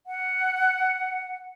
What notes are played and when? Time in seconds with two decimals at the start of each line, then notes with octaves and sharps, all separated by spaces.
0.07 F#5